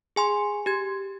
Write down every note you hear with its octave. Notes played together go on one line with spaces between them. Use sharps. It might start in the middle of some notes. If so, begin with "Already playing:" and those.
G#4 G#5 C6
G4 G#6